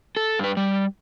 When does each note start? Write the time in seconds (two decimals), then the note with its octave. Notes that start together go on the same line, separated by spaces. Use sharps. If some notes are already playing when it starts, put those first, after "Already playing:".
0.17 A4
0.39 G2 B4
0.57 G3